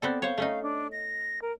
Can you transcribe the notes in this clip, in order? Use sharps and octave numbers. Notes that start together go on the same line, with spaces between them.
B3 C4 A4 D5
C5 C#5 F5
A3 C#4 D#4
D4
A#6
A#4